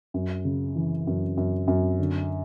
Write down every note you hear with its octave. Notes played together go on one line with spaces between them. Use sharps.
F#2
C#3
E3
F#2
F#2
F#2
D3